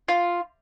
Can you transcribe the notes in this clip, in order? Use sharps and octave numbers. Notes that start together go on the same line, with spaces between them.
F4